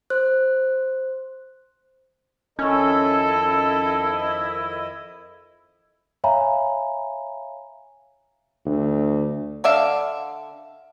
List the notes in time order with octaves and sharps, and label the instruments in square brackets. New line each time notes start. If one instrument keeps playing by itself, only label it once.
[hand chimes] C5 F#6
[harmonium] F2 D#5 [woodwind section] D#3 E4 [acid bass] C#4 [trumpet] A4
[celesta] C#5 E5 F5 G#5 A#5 B5
[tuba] D2
[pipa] D3 D5 E5 F5